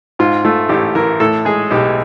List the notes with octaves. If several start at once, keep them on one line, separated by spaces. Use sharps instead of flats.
G#2 F4
A3 F4
A1 G4
E3 A#4
A2 A4
G#3 G#4
B1 G4